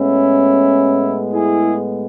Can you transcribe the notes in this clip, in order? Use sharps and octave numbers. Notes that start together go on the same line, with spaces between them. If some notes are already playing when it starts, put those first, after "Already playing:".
Already playing: A2 G#3 B3 C#4 E4
E4 G#4